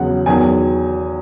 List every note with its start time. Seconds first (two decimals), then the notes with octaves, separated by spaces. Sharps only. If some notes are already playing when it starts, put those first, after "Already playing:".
Already playing: E2 C#3 F#3 F#5
0.26 E2 D#3 F#3 G#5